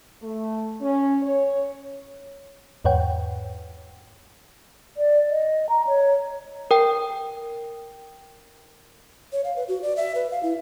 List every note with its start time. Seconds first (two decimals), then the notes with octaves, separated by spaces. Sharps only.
0.21 A3
0.80 C#4
1.21 C#5
2.85 E2 G#2 B4 C#5 F#5 G5
4.97 D5
5.30 D#5
5.69 A#5
5.87 C#5
6.71 A#4 G5
9.33 C#5
9.44 F5
9.56 B4
9.68 F#4
9.82 D5
9.97 E5
10.15 B4
10.31 F5
10.43 E4